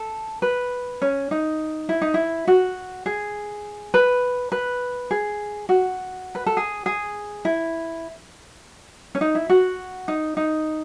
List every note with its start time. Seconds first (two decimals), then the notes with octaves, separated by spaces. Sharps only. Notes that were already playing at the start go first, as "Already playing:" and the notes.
Already playing: A4
0.42 B4
1.02 C#4
1.31 D#4
1.89 E4
2.01 D#4
2.14 E4
2.47 F#4
3.06 G#4
3.94 B4
4.52 B4
5.11 G#4
5.69 F#4
6.35 B4
6.46 A4
6.57 G#4
6.86 G#4
7.45 E4
9.15 C#4
9.21 D#4
9.35 E4
9.50 F#4
10.08 D#4
10.37 D#4